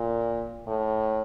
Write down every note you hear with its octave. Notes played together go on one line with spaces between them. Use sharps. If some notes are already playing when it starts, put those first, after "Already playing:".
Already playing: A#2
A2